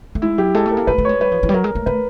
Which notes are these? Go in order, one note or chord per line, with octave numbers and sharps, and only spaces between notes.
A3
G#3 E4
F#3 G4
G#3 A4
A3
A#4
A#3
A3 B4
A3
G#3 C#5
G3 B4
F3
E3
G3
F#3 A#4
G#3
A3
A3 B4